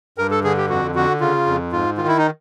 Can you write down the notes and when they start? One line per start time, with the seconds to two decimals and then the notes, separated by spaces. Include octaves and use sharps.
0.18 G2 A#4
0.31 A4
0.44 D3 G#4
0.57 G4
0.69 F2 F#4
0.95 D3 F#4
1.20 C#3 F4
1.46 F2
1.72 G#2 F4
1.98 D#3 F4
2.08 E4
2.17 D#4